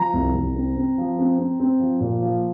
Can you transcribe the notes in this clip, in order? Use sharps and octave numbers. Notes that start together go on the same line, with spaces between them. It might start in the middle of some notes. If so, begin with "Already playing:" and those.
Already playing: F3 A#5
C2
C2
C4
C4
F3
C4
C4
C4
F3
A#2
F3